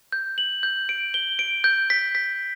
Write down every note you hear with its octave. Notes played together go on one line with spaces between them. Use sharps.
G6
F#7
G6
D7
G7
D7
G6
B6
B6